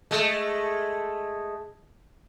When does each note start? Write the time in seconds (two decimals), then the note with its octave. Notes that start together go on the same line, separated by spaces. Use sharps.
0.11 G#3 A3